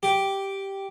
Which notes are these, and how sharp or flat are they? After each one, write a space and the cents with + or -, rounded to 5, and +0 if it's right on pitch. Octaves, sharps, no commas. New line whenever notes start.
G4 -5